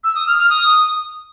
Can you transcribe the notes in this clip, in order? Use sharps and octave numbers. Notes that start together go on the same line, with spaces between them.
E6
D#6
F6
F6
D#6